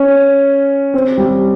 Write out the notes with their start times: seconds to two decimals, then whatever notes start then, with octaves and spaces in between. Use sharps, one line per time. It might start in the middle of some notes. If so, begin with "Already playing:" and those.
Already playing: C#4
0.94 C4
1.18 G3